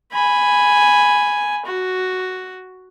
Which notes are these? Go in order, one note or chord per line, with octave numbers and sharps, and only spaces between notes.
G#5 B5
F#4